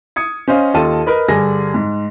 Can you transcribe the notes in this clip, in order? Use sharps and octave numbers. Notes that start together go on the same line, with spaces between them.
D#6 G#6 C#7
C#4 C5 D#5 F5
D#2 F4 A4 D#5 A5 D#7
A#4 B4 D#5
G2 D3 G#4 A#6
G#2